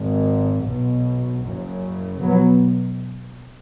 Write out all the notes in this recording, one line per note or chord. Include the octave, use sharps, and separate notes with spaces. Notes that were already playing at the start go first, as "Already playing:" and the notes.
Already playing: G#1 G#2
B1 B2
F#1 F#2 C#3
B1 F#3 B3